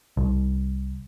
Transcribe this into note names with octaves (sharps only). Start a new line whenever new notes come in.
C2